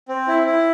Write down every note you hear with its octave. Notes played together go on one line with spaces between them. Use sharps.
C4
E4
E4